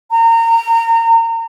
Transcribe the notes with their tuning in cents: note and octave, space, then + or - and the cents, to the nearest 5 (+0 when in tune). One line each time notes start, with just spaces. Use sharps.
A#5 -30